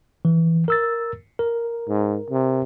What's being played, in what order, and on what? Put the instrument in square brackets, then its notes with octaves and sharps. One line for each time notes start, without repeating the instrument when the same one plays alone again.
[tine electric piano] E3
A#4 E6 A6
A#4
[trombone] G#2
C3